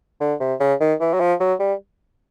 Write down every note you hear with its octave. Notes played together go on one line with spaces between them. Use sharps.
D3
C3
C#3
D#3
E3
F#3
F3
F#3
G3